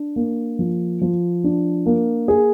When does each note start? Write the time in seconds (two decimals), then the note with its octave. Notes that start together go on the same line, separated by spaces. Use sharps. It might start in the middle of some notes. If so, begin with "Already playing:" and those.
Already playing: D4
0.16 A#3
0.59 F3
1.01 F3
1.44 D4
1.86 A#3
2.28 G#4